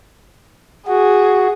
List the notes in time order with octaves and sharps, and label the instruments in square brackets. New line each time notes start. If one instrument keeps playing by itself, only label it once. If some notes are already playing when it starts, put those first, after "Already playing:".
[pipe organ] F#4 [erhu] G#4